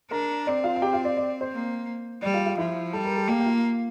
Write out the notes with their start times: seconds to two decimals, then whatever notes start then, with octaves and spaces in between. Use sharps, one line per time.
0.11 D4 A#4 A#5
0.47 C4 D5
0.64 F4 F5
0.76 F5
0.82 G4 G5
0.93 F4 F5
1.05 D5
1.17 D5
1.41 C5
1.52 A#3
2.22 G3 D5
2.34 F4 F5
2.46 F4 F5
2.58 F3 E4 E5
2.93 G3 A4 A5
3.04 A#4 A#5
3.16 A4 A5
3.28 A#3 G4 G5
3.40 G5
3.46 F4 F5